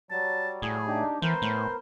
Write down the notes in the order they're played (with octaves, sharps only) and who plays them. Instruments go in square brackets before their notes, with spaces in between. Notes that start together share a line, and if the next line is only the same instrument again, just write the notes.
[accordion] F#3 G3 [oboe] A5
[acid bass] A2 [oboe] G#4
[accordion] D4 D#4 G4
[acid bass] E3 [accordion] B3 A#4 [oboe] C5
[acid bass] A2